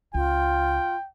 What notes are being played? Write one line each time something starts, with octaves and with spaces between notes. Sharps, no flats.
C#2 F4 G5